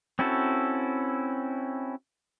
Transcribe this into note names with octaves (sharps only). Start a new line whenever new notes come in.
C4 C#4 E4 F#4 A4